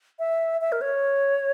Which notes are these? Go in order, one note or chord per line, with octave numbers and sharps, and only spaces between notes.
E5
E5
A#4
C#5